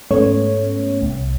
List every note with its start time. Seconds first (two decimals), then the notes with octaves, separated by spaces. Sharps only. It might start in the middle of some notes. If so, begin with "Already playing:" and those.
0.11 G#2 A3 B3 C#4 C#5
1.02 C2